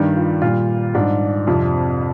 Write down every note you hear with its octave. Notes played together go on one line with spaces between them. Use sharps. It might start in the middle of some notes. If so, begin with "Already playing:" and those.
Already playing: G2 D#3 G3
F4
A#2 G3 F4
G#2 G3 D4
F2 C3 F3